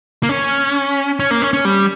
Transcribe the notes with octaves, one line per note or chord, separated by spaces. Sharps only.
A#3
C#4
C#4
A#3
C#4
C#4
G3